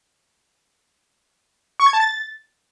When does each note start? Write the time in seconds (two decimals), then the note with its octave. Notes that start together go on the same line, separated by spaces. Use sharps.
1.80 C#6
1.86 G#6
1.93 A5
2.00 A6